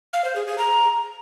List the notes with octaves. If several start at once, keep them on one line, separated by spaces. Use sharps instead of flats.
F5
C5
G#4
G#4
A#5